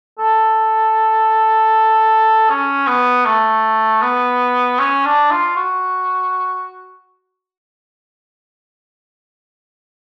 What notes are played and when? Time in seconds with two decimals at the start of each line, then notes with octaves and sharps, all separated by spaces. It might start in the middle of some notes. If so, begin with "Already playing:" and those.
0.19 A4
2.50 C#4
2.87 B3
3.26 A3
4.02 B3
4.80 C#4
5.05 D4
5.31 F4
5.56 F#4